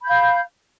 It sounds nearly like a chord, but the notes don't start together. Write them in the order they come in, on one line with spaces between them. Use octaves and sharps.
B5 G6 F5